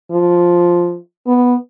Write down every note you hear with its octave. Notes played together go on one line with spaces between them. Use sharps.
F3
B3